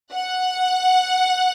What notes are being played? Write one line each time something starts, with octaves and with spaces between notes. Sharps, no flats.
F#5